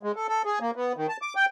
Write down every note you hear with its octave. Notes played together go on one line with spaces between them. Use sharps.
G#3
A4
A4
G#4
A#3
B3
D#3
A5
D6
G5